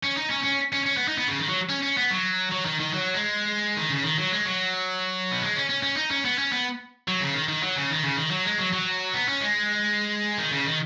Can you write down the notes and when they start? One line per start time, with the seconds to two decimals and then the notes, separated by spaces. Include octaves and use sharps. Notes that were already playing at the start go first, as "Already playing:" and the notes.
0.04 C#4
0.18 D#4
0.31 C#4
0.45 C#4
0.73 C#4
0.86 C#4
0.97 B3
1.08 D#4
1.18 B3
1.28 C#3
1.39 D#3
1.48 F#3
1.69 C#4
1.83 C#4
1.97 B3
2.11 F#3
2.52 F#3
2.66 D#3
2.80 D#3
2.94 F#3
3.14 G#3
3.76 D#3
3.90 C#3
4.03 D#3
4.18 F#3
4.32 G#3
4.45 F#3
5.31 B3
5.42 G#3
5.56 C#4
5.69 C#4
5.82 C#4
5.96 D#4
6.11 C#4
6.25 B3
6.38 C#4
6.52 B3
7.08 F#3
7.21 C#3
7.34 D#3
7.48 D#3
7.63 F#3
7.76 C#3
7.90 D#3
8.03 C#3
8.17 D#3
8.31 F#3
8.45 G#3
8.58 F#3
8.72 F#3
9.14 B3
9.28 C#4
9.41 G#3
10.38 D#3
10.52 C#3
10.66 D#3